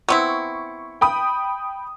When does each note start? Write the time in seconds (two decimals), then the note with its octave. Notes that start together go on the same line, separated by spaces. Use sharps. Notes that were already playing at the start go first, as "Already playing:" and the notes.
0.08 B3 C4 E4 C#6
1.01 G5 B5 D#6